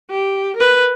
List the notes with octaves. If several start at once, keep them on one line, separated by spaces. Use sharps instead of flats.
G4
A#4 B4